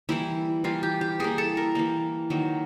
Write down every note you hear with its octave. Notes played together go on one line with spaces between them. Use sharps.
E3 G3 A#3 E4
E3 G3 A#3 F4
G4
G4
E3 G3 A#3 G#4
A4
A#4
E3 G3 A#3
D#3 F#3 A#3